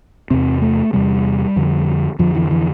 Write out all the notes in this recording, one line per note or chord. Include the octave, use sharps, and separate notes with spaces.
E2 C3 C4
A3
E2 C3 G3
F2 D3
F2 D3 F3
E3
E3